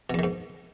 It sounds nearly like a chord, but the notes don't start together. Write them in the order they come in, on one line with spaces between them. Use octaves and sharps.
B2 E2 D#3 G#2